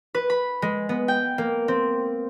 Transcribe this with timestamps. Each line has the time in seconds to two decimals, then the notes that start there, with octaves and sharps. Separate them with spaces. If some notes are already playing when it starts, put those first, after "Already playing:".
0.14 B4
0.30 B5
0.62 G#3
0.89 B3
1.08 G5
1.38 A#3
1.68 C4